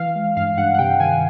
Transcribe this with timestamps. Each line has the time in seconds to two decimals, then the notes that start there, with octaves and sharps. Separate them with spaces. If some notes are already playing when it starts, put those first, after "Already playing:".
Already playing: E3 F5
0.16 G#3
0.36 G2 F5
0.58 G2 F#5
0.74 F#5
0.79 C3 G5
1.00 D#3 G#5